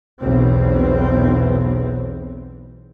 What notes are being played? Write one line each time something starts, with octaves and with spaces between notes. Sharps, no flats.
B1 E2 C4